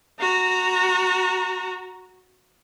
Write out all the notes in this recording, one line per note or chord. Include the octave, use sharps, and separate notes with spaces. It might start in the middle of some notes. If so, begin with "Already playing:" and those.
F#4 A#5